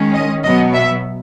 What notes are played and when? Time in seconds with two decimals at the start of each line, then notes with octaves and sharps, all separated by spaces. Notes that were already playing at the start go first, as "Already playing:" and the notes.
Already playing: D#3 G#3 C#4
0.14 D#5
0.43 B2 F#3 B3 D#5
0.74 E5